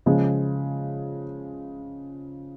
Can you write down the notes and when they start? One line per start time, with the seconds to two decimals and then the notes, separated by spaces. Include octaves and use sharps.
0.06 C#3 F3 G#3